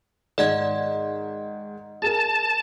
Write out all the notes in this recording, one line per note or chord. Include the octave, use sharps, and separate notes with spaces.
G#2 D#3 D5 D#5 F#5 G#6
G#4 A#4 A5